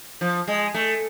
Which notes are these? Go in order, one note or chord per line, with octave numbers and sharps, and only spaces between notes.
F3
G#3
A3